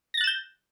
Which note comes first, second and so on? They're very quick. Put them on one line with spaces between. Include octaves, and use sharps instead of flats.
A#6 A6 F#6 E7 G6